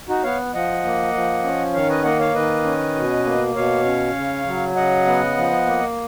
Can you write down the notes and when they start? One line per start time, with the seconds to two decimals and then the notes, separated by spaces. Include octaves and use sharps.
0.09 D#4 F#4
0.23 B3 C#5 F5
0.53 F3 D#5 F#5
0.84 A#3
1.14 F3
1.44 C#4
1.74 D#3 C#5 F5
1.89 B4 D#5
2.04 A#3 D#5 F#5
2.20 C#5 F5
2.35 D#3 B4 D#5
2.65 C#4
2.96 B2
3.25 A#3
3.55 B2 C#5 F5
3.86 C#4
4.16 C#3
4.46 F#3
4.75 C#3 D#5 F#5
5.06 B3
5.37 F3
5.66 A#3